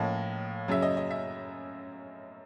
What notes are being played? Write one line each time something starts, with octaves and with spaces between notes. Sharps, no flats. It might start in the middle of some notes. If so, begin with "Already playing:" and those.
Already playing: A2 F3 A#3 C#4 D#5
F#2 C#3 F#3 E5
D#5
D#5
E5